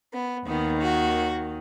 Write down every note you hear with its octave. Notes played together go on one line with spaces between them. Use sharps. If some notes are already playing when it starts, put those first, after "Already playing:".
B3
D#2 D#3 B3
F#4